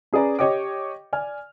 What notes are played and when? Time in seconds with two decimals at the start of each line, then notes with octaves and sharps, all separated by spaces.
0.13 C#4 G#4 B4 D5 A#5
0.39 G4 C#5 D#5 G5 D6
1.13 D5 G#5 F6